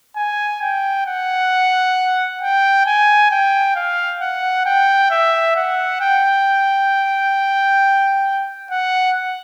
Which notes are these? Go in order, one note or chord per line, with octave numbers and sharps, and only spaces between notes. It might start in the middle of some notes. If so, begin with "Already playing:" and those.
G#5
G5
F#5
G5
G#5
G5
F5
F#5
G5
E5
F#5
G5
F#5